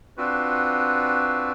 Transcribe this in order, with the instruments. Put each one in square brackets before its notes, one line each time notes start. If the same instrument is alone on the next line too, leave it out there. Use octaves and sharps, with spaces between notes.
[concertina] C4 D4 F4 F#4 B4